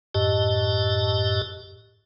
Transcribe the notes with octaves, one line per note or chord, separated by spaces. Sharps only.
F#2 A2 G4 D#5 A5